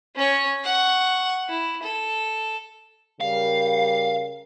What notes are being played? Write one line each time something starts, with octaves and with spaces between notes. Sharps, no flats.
C#4 C#5
F#5 C#6
E4
A4
C#3 G3 A#4 F5